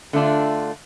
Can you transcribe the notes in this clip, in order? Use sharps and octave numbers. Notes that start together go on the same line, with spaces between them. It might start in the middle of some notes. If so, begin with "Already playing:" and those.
D3 A3 D4 F4